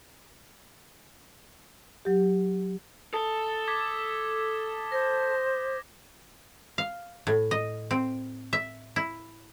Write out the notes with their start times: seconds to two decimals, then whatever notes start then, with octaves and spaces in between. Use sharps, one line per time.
2.05 F#3 G4
3.13 A4 D#6 G7
3.68 D6 G#6 B6
4.92 C5 A#6
6.78 F5
7.27 A2
7.51 D#5
7.91 C4
8.53 E5
8.96 E4